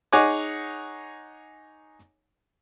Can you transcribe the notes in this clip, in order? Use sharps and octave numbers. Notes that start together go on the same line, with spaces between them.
D#4 G#4 C#5 F#5 G#5 D6